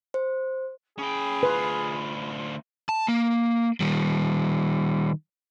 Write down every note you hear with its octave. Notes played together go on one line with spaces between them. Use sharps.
C5
C#4 G#4 G5 B5
D2 F4 B4
A5
A#3
D#3 G3